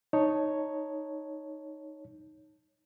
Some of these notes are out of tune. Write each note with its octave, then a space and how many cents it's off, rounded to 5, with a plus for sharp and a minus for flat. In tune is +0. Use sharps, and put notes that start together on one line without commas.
D#4 +0 C#5 +0 A5 +0